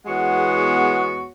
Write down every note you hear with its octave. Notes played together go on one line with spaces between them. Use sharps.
E2 G#3 B3 F#4 C#5 F#5